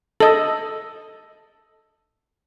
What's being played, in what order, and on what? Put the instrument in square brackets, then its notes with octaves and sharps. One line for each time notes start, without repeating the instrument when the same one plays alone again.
[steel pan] A4 D#5